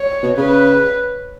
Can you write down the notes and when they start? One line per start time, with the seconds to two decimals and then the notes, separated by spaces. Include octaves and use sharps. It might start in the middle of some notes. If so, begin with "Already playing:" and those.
Already playing: C#5
0.23 B2
0.37 C#3 B4